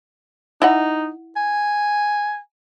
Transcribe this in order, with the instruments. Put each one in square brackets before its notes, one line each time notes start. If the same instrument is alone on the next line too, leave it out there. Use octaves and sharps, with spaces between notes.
[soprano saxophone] D#4 [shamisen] E4 D#5 F#5
[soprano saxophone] G#5